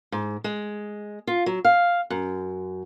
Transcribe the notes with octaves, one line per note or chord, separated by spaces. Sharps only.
G#2
G#3
F4
F#3
F5
F#2